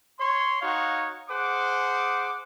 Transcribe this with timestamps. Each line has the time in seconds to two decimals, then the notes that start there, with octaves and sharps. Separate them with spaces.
0.19 C#5 C6
0.61 D#4 F#4 C#5 F5 F#5
1.30 G#4 C5 F#5 D6